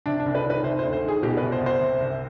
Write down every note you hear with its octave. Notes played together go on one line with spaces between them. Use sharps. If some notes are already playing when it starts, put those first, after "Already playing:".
C3 D4
D4
C2
B4
D#3
B4
C3 C5
C5
D2
C5
D#3 G#4
B2 G4
B4
C2
C5
C2
C5
C3
C2